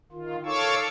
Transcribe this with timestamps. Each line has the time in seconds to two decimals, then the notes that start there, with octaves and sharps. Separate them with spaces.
0.12 D#3 F4
0.46 A4 C#5 F5 C#6 D6 E6